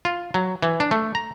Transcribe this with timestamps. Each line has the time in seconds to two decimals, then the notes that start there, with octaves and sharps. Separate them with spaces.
0.05 F4
0.34 F#3
0.62 E3
0.80 D4
0.91 A3
1.15 A#5